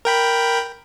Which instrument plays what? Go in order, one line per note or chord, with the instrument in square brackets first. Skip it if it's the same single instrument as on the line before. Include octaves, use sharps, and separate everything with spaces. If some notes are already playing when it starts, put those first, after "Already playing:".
[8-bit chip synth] A#4 G5 B5